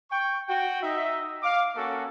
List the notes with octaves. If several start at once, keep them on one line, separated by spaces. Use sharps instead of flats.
G5 C#6
F#4 G5
D#4 D#5 E5
F5 D6
A#3 C#4 F#4 A4